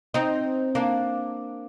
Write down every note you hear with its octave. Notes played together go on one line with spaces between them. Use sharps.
C4 D#4
A#3 D4